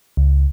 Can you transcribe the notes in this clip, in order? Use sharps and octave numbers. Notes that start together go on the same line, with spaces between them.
C#2